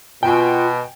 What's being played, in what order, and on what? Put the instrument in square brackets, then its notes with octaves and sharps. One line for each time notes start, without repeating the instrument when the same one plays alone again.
[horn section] B2 [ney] F4 [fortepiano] G5 G#5